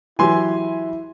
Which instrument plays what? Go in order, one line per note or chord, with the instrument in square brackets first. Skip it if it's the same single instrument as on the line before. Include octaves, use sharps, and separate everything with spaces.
[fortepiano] E3 F#3 G4 [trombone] E4 [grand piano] G#5 C6